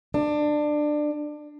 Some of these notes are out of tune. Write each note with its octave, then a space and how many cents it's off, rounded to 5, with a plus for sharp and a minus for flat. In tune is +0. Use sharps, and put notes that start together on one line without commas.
D4 +20